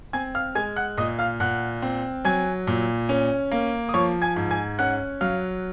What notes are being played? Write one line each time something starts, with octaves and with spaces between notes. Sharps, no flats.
C4 G#5 G#6
F5 F6
G#3 G#5 G#6
F#5 F#6
A#2 D#5 D#6
F5 F6
A#2 F#5 F#6
C4
F#3 G#5 G#6
A#2
C#4
A#3
D#6
F3 C#5 C#6
G#5 G#6
G#2
G#5 G#6
C#4 F#5 F#6
F#3 F5 F6